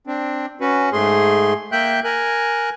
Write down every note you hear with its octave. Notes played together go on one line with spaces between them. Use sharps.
C4 D4
C#4 F#4 B4
G#2 A3 G#4 C6
A#3 E5 G5 F#6 G6
A#4 G#5 F#6